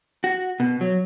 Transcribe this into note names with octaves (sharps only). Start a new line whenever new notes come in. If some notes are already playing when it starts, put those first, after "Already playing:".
F#4
B2
F#3